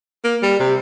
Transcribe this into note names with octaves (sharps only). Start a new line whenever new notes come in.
A#3
G3
C3